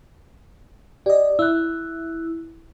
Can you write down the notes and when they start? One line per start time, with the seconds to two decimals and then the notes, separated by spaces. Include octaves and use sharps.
1.06 G4 D5 D#5
1.39 E4 E6 F#6